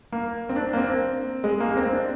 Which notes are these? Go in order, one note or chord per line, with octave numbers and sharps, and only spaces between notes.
A#3
C4
D4
A#3
C4
G#3
A#3
A#3
C4
D4